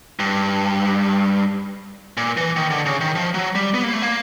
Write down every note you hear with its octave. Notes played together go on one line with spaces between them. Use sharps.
G2
A#2
E3
D#3
D3
C#3
D#3
F3
F#3
G3
B3
A#3
A3
A#3